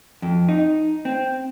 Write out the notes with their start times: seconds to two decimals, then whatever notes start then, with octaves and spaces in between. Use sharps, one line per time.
0.22 F2
0.49 D#4
1.05 C4